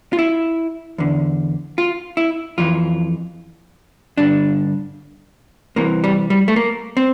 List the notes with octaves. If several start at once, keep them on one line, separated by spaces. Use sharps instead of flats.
F4
E4
E2 D3
F4
E4
F2 E3 F4
G2 D3 D4
C2 C3 E3 A#3
G3
G3
A3
A#3
C4